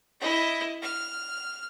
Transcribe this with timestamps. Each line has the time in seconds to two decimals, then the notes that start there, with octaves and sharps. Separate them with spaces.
0.20 E4 D#5
0.82 F6